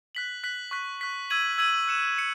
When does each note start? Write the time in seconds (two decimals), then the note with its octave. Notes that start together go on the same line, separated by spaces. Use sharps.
0.15 F#6 B6 F#7
0.44 F#6 B6 F#7
0.71 C#6 F#6 B6
1.01 C#6 F#6 B6
1.30 E6 G#6 D#7 F#7
1.58 E6 G#6 D#7 F#7
1.88 F#6 C#7 E7
2.17 C#7 E7